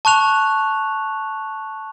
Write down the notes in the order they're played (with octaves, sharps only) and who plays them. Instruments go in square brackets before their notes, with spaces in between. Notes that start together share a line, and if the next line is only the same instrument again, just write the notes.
[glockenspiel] A5 C#6 F#6 F7